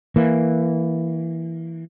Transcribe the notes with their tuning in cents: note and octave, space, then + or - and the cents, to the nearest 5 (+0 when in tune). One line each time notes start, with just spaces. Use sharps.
E3 +0 A#3 +0